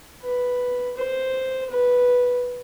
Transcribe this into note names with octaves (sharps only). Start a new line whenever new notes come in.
B4
C5
B4